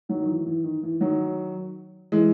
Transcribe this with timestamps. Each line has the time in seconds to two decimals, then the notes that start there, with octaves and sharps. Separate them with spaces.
0.09 D#3 F#3
0.21 D#3
0.27 E3
0.46 E3
0.64 D#3
0.83 E3
1.01 D#3 F#3
2.12 E3 G#3